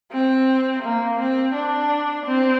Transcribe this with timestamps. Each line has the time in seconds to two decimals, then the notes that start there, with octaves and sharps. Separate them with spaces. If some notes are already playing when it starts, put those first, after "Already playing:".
0.12 C4
0.83 A#3
1.19 C4
1.54 D4
2.26 C4